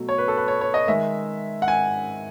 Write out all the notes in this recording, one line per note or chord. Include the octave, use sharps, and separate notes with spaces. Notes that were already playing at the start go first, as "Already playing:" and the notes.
Already playing: B2 F#3 A3
C#5
B4
A4
B4
C#5
C#5
D#5
D#3 G#3 E5
F#5
G#5